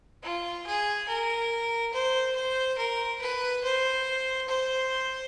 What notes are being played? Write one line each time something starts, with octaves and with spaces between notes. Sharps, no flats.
F4
G#4
A#4
C5
C5
A#4
B4
C5
C5